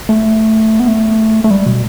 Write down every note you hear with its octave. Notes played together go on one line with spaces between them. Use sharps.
A3
B3
A3
A3
G3
B2